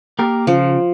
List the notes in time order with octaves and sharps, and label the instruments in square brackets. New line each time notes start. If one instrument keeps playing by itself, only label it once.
[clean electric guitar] A#3 G4 A#4
[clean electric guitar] C#3 [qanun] F3